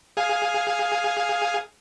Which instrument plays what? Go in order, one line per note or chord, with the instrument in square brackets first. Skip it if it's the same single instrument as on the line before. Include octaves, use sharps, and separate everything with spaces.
[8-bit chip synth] G#4 F5 G#5